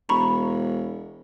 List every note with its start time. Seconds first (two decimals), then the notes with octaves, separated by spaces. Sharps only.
0.09 E1 A#5 B5 C#6